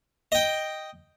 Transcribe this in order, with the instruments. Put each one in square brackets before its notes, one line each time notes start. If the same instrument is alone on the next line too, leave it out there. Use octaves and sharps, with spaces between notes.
[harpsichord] D#5 G5